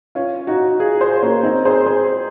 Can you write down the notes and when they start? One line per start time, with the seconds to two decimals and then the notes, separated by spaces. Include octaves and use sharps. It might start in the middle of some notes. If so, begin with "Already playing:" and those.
0.15 C#4 F4
0.47 D#4 F#4
0.79 F4 G#4
1.01 G#4 C5
1.23 A#3 C#4
1.43 C4 D#4
1.65 G#4 C5
1.86 G#4 C5